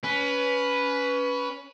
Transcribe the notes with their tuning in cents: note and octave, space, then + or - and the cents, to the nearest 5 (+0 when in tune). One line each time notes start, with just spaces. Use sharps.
C#4 +25 B4 +0